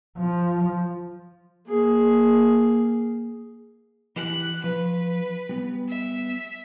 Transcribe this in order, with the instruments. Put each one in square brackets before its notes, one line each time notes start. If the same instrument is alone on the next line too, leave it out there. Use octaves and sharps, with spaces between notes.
[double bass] F3
[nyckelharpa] A#3 G#4
[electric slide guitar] E3 G4 [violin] F#6
[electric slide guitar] F3 [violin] B4
[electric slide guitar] G3 B3
[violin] E5